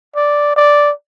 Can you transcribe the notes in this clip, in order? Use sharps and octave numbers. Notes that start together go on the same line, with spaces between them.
D5
D5